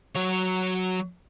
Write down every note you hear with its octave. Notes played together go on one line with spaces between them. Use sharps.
F#3 C#5